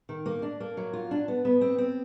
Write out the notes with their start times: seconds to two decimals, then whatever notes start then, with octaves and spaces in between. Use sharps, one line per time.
0.09 D#3
0.26 A#3
0.42 D4
0.60 A#3
0.77 F#3
0.93 F4
1.11 D4
1.28 B3
1.45 B3
1.61 C4
1.78 C4